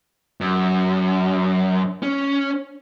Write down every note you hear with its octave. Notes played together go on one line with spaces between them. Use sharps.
F#2
C#4